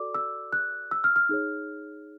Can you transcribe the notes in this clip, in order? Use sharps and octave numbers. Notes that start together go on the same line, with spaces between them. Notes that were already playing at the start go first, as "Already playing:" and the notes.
Already playing: F#4 A4 D5 D6
E6
F#6
E6
F6
F6
D#4 G#4 C#5